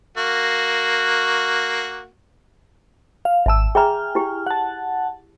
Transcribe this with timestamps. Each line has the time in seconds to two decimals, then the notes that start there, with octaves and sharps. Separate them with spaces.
0.17 A#3 F#4
3.25 F5
3.46 G#1 E5 A5 E6
3.75 G#4 E5 G5 G#5 A#5 F6
4.15 E4 G4
4.47 F#5 A5